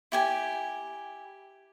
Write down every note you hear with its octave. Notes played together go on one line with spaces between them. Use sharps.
E4 G4 G#5